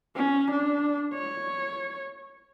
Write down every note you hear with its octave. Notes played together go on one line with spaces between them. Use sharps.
C#4
D4
C#5